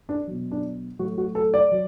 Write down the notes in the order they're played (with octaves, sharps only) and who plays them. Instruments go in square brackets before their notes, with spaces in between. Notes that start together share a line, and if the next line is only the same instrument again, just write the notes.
[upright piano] D4
B2 F#3
D4
A2 F#3 F#4
F#4
A4
D5
F#3